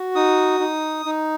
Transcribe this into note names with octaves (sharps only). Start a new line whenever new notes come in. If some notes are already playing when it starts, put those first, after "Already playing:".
Already playing: F#4
D#4 D#6
D#4
D#4